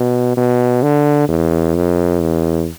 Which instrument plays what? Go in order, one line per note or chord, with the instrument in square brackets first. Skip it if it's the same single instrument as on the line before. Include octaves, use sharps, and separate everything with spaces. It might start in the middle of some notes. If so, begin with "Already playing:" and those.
Already playing: [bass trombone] B2
B2
D3
E2
F2
E2